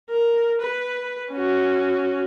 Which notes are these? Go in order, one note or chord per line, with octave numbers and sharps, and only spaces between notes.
A#4
B4
C#4 F#4